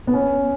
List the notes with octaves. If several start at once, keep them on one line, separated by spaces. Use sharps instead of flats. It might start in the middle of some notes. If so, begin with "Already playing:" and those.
B3
C#4